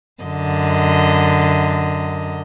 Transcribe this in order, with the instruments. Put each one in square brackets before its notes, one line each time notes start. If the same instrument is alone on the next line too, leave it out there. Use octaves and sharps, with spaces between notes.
[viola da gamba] F#2 D3 D#5